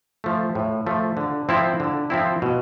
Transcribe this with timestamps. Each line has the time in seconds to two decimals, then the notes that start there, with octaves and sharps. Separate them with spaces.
0.24 F3 A3
0.55 A2
0.87 F3 A3
1.17 D3
1.49 F3 C4 E4
1.80 D3
2.10 F3 C4 E4
2.42 B2